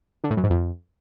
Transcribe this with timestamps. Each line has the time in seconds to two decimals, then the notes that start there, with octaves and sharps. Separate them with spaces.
0.24 D3
0.30 A2
0.37 F#2
0.43 G#2
0.50 F2